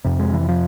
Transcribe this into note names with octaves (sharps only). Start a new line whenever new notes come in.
F2 C3
G#3
E3
F3